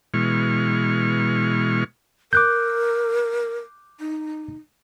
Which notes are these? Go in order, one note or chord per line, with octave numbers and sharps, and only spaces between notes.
B2 E3 G#3 C#6 F6
A#4 D6 F#6 G6
D#4